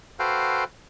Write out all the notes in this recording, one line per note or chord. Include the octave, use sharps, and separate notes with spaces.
F#4 A4 B4 C5 F5 G5